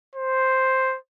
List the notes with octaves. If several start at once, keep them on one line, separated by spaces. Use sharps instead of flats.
C5